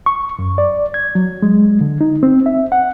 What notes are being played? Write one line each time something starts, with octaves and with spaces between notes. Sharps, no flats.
C#6
F#2
D5
G#6
F#3
G#3
D3
D#4
C4
E5
F#5